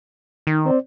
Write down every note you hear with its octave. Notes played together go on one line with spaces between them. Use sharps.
D#3 D#4
C4 C5 D5